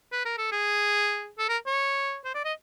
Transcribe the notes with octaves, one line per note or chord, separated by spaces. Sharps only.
B4
A#4
A4
G#4
A4
A#4
C#5
C5
D5
D#5